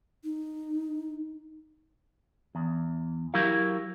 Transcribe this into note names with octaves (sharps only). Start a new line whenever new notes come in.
D#4
E2
F#3 E4 G4 A#4 F5